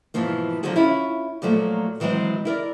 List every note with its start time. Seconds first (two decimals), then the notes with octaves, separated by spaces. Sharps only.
0.14 G#2 B2 E3 F3 A#3
0.63 D3 D#3 F3 F#3 F#4 G#4
0.76 C#4 E4 F4
1.42 A#2 F3 F#3 A3 A#3
2.00 D#3 E3 F#3 G#3 C4
2.45 E4 A#4 D5